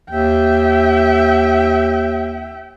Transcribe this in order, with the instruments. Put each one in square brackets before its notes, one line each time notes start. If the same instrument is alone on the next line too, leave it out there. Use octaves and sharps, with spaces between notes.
[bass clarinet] D#2 [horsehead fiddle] E5 G5